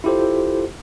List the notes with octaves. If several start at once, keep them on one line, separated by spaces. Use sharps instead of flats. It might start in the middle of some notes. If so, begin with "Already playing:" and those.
E4 F4 G4 A4 C5